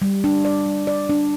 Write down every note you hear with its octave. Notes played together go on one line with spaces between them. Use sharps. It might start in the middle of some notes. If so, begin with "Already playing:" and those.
G3
D4
D5
G3
D5
D4